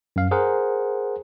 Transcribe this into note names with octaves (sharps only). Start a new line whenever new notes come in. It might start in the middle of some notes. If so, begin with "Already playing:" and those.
F#2 F5
G#4 A#4 C5 F#5